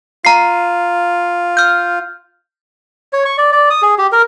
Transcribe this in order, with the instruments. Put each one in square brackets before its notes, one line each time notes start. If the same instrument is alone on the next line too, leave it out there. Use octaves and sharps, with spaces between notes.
[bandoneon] F4 [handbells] A#5 C7
[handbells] F6 G6
[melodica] C#5
C#6
D5
D5
D#6
G#4
G4
A#4